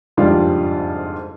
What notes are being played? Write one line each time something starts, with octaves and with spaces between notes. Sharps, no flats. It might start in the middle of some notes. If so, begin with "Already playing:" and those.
F#1 F2 G#2 G3 D4 F4